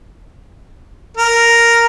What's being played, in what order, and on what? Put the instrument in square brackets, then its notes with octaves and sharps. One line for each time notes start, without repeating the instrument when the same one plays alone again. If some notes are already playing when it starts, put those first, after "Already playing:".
[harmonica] A#4